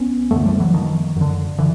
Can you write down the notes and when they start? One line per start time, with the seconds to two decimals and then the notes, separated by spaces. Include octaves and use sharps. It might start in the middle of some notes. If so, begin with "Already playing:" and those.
Already playing: C2 B3 C#4
0.31 F#2 D3 A3 B3
0.45 F3 G3
0.60 E3 F#3
0.74 D#3 F3
1.16 F#2 D3
1.59 D3 E3